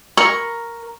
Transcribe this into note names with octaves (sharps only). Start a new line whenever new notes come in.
A#4 C#6